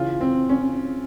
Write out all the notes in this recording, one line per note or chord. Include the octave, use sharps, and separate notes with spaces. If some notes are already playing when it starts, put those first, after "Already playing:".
Already playing: C#3 E3 F4
C4
C#4